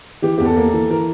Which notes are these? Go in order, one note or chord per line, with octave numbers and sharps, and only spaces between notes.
E3 G4
E2 G4
A4
A#3
A4
E3
E3 A#4